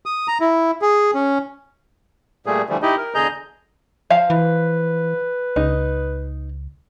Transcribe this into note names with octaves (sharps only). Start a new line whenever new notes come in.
D#6
A#5
E4
G#4
C#4
A#2 G3 A3 G#4
D3 E3 F3 G3 A3
D#4 E4 G4 D#5
A#4
E2 D3 G#4 D#5 A#5 G6
F3 F5 A5
E3 B4
C#2 D#4